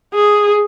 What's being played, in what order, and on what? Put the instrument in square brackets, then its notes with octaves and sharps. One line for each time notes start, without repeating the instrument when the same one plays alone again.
[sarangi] G#4